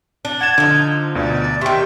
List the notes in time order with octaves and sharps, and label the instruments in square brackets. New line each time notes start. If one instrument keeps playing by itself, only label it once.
[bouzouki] D4
[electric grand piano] F#5 A6 E7 [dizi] G#6
[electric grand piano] D3 [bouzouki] F3 D#4
[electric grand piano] D2 B2 [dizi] D5
[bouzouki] C3 D#3 [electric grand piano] E5 G5 [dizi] C#6